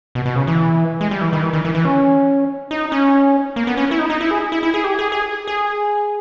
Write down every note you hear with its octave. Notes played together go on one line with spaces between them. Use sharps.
B2
B2
C#3
E3
G#3
G3
E3
D#3
E3
D#3
E3
E3
C#4
D#4
C#4
A#3
B3
C#4
E4
D#4
D#4
E4
G#4
E4
E4
G#4
G4
G#4
G#4
G#4